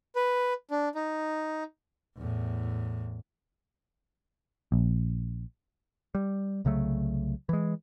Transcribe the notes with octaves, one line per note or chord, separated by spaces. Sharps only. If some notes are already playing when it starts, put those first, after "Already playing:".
B4
D4
D#4
E2 A2
A#1
G3
C2 C#3 F#3 A3
E3 G#3